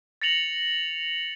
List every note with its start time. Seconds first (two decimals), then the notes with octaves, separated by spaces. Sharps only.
0.22 A6 A#6 C#7 F7 F#7